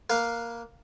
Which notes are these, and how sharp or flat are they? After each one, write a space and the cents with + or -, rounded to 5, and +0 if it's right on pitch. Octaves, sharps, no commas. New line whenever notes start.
A#3 +0 B4 -20 F5 +0